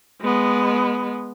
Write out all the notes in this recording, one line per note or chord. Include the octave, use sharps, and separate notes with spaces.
G#3 B3